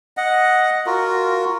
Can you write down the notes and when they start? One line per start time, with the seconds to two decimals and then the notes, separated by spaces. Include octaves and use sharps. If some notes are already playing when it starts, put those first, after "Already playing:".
0.17 D#5 F#5
0.86 F4 F#4 A#4